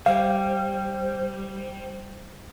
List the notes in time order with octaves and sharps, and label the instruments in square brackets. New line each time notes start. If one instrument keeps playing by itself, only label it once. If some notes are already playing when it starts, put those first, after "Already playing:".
[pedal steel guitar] G3 [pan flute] C5 [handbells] F5